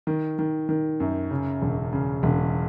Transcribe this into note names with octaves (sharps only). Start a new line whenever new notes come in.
D#3
D#3
D#3
F#2
C#3
E1
C#3
E1